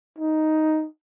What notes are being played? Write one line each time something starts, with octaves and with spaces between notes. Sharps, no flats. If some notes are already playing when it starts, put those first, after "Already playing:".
D#4